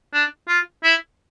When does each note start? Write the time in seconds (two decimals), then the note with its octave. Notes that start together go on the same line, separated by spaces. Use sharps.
0.14 D4
0.48 F4
0.84 E4